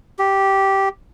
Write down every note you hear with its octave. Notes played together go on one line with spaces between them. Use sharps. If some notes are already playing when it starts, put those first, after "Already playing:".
G4